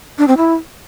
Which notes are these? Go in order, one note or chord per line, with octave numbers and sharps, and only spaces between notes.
D4
C4
E4